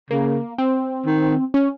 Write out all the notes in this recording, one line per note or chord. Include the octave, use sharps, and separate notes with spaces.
C#3 A#3
C4
D#3
C#4